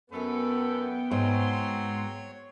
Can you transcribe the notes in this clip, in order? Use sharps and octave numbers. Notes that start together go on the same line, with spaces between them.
F#2 B3 C#4 A4 B4 G5
G#2 F#3 C4 C#5 C6